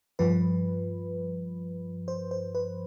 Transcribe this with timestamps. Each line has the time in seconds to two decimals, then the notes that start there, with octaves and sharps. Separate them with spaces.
0.19 G2 F3 B4
2.08 C5
2.31 C5
2.55 B4